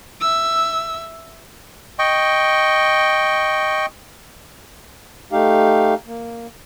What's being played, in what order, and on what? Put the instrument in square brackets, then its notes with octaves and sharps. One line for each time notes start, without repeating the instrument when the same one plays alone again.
[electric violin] E5 E6
[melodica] D#5 G5 C#6
[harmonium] A3 D#4 G4 F5
A#3